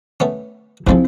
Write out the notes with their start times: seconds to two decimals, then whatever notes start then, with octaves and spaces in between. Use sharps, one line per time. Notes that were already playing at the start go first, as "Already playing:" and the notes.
0.20 A3 B3 C#4
0.87 C3 F3 G#3 C4 E4